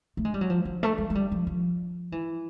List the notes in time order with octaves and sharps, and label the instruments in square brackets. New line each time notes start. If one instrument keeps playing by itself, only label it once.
[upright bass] A3
G#3
G3
F#3
F3
F3
A3
G#3
G#3
G3
F3
F3
E3